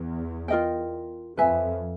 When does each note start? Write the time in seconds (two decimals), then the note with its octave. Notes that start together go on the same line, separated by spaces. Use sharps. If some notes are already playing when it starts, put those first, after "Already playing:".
Already playing: E2
0.48 F4 A#4 D#5 G5
1.37 F2 B4 E5 G#5